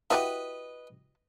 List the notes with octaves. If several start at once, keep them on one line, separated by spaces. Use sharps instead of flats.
E4 F#4 G4 B4 D#5 B5